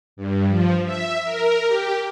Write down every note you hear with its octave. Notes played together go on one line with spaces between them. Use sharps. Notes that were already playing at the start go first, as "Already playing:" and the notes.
G2
F3
E5
A#4
G4